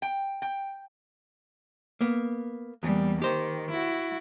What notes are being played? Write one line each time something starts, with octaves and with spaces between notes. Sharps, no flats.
G5
G5
A#3 B3
E2 G3 A#3
D#3 G4 C5
E4 F#4